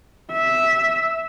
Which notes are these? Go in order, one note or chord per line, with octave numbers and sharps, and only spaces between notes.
E5